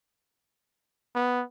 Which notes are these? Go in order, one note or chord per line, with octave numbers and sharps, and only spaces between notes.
B3